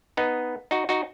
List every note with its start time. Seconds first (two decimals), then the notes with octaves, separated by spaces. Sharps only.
0.17 B3 D#4
0.71 D#4 F#4
0.89 D#4 F#4